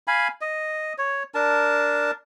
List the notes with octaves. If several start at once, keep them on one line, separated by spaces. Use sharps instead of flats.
F5 G#5 B5
D#5
C#5
D4 A#4 A5